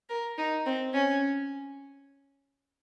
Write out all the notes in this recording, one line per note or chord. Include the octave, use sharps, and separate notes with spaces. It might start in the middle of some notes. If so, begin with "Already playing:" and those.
A#4
D#4
C4
C#4